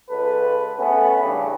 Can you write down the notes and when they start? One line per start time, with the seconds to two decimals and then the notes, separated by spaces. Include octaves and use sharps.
0.10 C#2 A4 B4
0.80 A3 B3 C#4
1.23 E2 G2 C#3